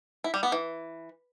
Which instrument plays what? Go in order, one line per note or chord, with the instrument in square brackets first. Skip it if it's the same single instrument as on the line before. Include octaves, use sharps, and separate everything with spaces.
[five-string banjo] E4
G3
B3
E3